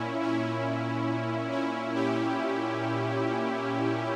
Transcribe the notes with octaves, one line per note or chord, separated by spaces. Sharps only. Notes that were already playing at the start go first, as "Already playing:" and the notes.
Already playing: A#2 C#4 E4
C#4 E4
C#4 E4
E4 G4